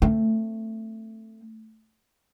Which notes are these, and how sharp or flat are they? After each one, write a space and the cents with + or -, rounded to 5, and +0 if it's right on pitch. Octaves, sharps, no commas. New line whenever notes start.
A3 +15 C4 +0